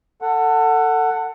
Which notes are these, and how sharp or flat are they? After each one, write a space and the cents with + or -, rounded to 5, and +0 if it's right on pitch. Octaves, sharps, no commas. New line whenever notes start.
A4 +25 F#5 +0